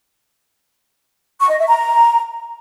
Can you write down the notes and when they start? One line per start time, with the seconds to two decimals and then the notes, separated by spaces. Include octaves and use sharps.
1.39 C#6
1.49 D#5
1.58 E5
1.68 A#5